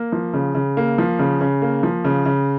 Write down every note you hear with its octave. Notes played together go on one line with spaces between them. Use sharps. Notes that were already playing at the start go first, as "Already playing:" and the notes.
Already playing: A#3
F3
C#3
C#3
A#3
F3
C#3
C#3
A#3
F3
C#3
C#3